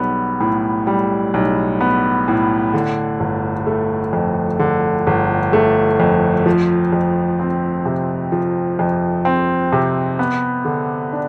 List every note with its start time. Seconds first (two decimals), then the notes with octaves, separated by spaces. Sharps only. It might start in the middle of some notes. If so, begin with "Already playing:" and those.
Already playing: B1 G3 B3
0.40 A2
0.87 G3
1.34 B1
1.81 B3
2.28 A2
2.73 D3
3.20 G1
3.66 A3
4.13 F2
4.59 D3
5.07 G1
5.53 A3
6.00 F2
6.46 F3
6.93 F2
7.40 C4
7.85 C3
8.32 F3
8.79 F2
9.25 C4
9.72 C3
10.19 B3
10.65 D3
11.12 D4